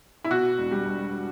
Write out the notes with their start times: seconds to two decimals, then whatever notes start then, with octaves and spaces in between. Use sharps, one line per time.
0.24 E4
0.30 B2 F#4
0.58 E1
0.71 G3
0.86 E1